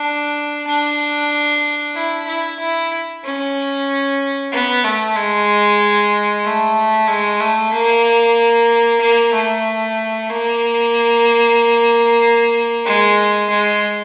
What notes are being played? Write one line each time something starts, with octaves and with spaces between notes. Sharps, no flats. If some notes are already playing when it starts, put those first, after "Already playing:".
Already playing: D4
D4
E4
E4
E4
C#4
B3
A3
G#3
A3
G#3
A3
A#3
A#3
A3
A#3
G#3
G#3